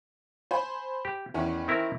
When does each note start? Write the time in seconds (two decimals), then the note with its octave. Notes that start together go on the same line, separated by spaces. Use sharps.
0.51 C5 G#5 B5
1.05 G4
1.34 E2 D#3 E3 C#4
1.68 C4 E4 A#4